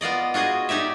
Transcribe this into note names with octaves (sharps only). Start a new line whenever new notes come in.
B3 F4 D5 D#5
F4 F#4 G#4 D#5
D#4 G4 D5 E5